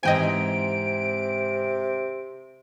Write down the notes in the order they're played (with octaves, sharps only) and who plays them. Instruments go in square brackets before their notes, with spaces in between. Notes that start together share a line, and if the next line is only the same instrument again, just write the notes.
[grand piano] G#2 E3 C4 [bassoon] C3 [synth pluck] D#5 G5 G#5 [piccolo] D7